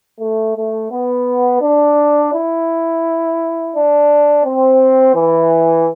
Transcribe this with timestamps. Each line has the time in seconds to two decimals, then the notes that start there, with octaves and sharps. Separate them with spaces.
0.20 A3
0.56 A3
0.91 B3
1.61 D4
2.33 E4
3.74 D4
4.44 C4
5.14 E3